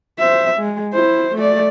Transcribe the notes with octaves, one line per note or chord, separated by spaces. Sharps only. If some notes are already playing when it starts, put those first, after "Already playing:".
C5 E5
G#3
E4 C5
A3 D5